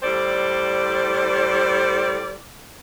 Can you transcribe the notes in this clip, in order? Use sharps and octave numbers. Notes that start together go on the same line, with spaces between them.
A2 G3 A4 C5 D5